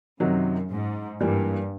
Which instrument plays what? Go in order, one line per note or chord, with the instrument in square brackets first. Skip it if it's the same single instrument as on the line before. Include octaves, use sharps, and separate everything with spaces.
[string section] F#2 [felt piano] C3 D#3 F#3
[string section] G#2
[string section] G2 [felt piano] E3 G3 A#3